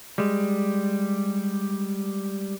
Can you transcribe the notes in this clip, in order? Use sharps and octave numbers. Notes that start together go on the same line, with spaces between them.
G3 G#3